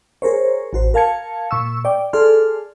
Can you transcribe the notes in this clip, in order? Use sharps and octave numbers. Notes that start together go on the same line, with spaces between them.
G#4 A#4 C5 C#5
A1 F#4 C5
A#4 F5 A5 G#6 C#7
A#2 C#6 E6
D5 G5
G#4 A4 D5 C6 F6